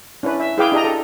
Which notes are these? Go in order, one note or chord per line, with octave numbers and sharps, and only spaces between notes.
C#4 D4 E4 B4
E5
E4 G#4 B4 F5 G5 D6
D4 G4 D#5 A#5
A4